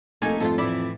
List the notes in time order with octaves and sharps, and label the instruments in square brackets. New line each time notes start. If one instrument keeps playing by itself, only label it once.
[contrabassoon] F1 [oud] A3 A4 [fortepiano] A#3 D#4 G#5
[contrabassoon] F2 [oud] G#2 A3 F4 [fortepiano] A4
[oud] A2 E3 [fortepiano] E4 D5 B5